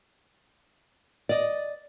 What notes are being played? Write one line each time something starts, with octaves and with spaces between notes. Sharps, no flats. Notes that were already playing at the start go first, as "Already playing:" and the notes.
D5 D#5